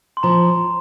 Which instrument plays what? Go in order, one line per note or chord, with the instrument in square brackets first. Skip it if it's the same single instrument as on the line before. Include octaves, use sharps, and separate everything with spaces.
[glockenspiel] C6
[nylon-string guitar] F3 [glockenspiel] A#5